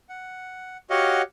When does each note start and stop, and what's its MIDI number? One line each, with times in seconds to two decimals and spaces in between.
0.09 0.77 78
0.90 1.22 66
0.90 1.22 67
0.90 1.22 73
0.90 1.22 75
0.90 1.22 77
0.90 1.22 78